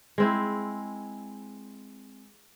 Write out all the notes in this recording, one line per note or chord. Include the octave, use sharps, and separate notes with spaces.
G#3 C4 E4